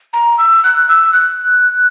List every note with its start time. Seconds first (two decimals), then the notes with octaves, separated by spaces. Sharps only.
0.13 A#5
0.38 E6
0.64 F#6
0.89 E6
1.13 F#6